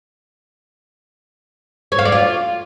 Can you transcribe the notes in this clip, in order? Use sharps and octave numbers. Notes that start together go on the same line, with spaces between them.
C#5
F5
D5
F4